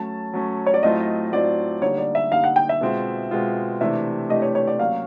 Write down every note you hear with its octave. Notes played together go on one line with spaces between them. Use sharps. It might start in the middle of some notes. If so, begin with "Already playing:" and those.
Already playing: F#3 A3 C#4 A5
F#3 A3 C#4
C#5
D5
A2 F#3 A3 C4 F4 D#5
A2 F#3 A3 C4 F4 D5
D3 G3 A#3 D#4 C#5
D5
E5
D3 G3 A#3 D#4 F5
F#5
G5
E5
B2 G#3 C4 F4
B2 G#3 C4 F4
C3 E3 A3 D4 G4 E5
C3 E3 A3 D4 G4 D#5
C#5
C#5
D5
F#3 A#3 C#4 F#4 F5